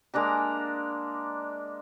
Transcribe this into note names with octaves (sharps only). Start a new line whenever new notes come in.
G#3 A#3 D4 A#5